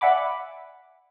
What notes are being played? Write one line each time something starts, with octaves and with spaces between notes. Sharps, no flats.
D5 E5 F#5 G#5 B5 D6